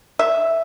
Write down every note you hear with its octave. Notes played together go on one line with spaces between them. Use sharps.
E5